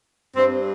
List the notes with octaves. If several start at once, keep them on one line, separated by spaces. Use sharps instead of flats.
G2 G3 C4